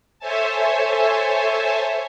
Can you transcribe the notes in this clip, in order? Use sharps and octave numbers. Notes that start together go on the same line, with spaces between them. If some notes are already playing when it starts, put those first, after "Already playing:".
A4 C5 C#5 E5 G#5 A5